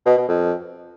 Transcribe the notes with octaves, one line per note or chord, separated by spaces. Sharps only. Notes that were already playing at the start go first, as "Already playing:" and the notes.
B2
B2
F2